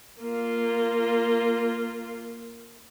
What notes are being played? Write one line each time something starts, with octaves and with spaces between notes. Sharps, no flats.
A#3 F4